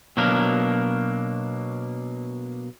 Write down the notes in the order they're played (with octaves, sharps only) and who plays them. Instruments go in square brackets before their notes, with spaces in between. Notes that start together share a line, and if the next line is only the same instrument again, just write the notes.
[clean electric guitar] B2 F#3 A#3 D4 A#4